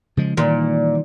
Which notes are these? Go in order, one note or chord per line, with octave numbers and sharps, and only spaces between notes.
C#3 F3 G#3
A#2 D#3 E3 G3